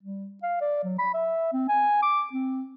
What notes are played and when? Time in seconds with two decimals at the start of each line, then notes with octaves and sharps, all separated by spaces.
0.03 G3
0.43 F5
0.61 D5
0.84 F#3
0.99 B5
1.14 E5
1.53 C4
1.69 G#5
2.02 D6
2.33 C4